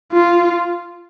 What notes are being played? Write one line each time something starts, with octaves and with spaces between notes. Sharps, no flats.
F4